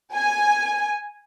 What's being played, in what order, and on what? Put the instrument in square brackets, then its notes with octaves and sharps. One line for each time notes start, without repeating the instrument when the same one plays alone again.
[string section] G#5